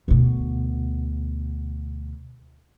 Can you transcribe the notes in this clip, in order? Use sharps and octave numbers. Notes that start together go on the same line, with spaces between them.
D2 B2